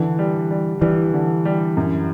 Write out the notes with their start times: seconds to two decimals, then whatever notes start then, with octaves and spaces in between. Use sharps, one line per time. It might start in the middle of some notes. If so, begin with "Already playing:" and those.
Already playing: D3 E3
0.19 G3
0.51 G3
0.81 E3 G3
1.14 D3
1.45 G3
1.77 F#2